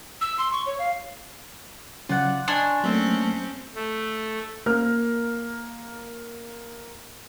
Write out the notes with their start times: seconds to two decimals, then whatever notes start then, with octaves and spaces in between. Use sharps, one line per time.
0.21 E6
0.38 C6
0.53 C#6
0.66 C#5
0.79 F5
2.09 C#3 F#3 C#4 F4 D5 F#5
2.48 D4 C#5 D#5 G#5 C6
2.84 F#3 A3 A#3 C4 C#4 E5
3.75 A3
4.66 A#3 A#4 F6